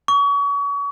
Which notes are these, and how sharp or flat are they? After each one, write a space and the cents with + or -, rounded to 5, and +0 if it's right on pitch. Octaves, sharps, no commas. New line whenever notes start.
C#6 +35